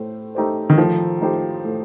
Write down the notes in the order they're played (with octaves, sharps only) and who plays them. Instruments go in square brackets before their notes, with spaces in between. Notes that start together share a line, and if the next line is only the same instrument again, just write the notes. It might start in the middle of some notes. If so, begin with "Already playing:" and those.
Already playing: [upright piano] A2 A3 C5
A3 D#4 G4 C5
[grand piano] D#3
[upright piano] A2 [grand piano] F3
[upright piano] A3 D#4 G4 C5
A2